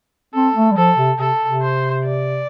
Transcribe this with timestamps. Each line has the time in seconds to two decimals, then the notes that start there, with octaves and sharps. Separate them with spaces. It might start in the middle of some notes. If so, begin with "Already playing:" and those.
0.34 C4 A4
0.55 A3
0.72 G3
0.77 F3 A4
0.97 C3
1.18 C3 A4
1.45 C3
1.61 C5
2.03 D5